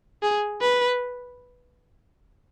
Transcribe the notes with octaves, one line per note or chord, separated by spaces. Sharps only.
G#4
B4